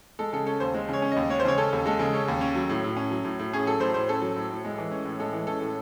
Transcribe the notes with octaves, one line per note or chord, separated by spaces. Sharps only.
G#3 A4
C#3 A4
C#4 A4
D#2 C5
G#3
C#3 C#5
C#4
D#2 D#5
G#3 C#5
C5
C#3 C#5
C#4 A4
D#2
G#3 A4
C#3
C#4
D#2
C#4
F#3
A2
A2
C#4
F#3
A2
A2
C#4 G#4
F#3 A4
A2 C5
A2 C5
C#4 A4
F#3
A2
A2
G#3
E3
C#4
A2
G#3 A4
E3
C#4 A4
A2